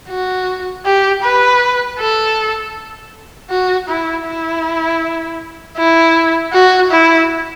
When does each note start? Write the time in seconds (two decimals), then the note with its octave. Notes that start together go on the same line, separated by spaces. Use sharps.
0.09 F#4
0.85 G4
1.24 B4
1.99 A4
3.50 F#4
3.88 E4
4.26 E4
5.77 E4
6.53 F#4
6.91 E4